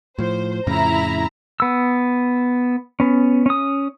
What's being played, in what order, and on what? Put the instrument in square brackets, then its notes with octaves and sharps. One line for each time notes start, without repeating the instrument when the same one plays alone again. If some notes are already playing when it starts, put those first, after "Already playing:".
[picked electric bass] A2 F3 [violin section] C5
[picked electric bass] F2 A2 C#3 [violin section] E4 A#5
[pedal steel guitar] B3 E6
B3 C#4
C#4 D#6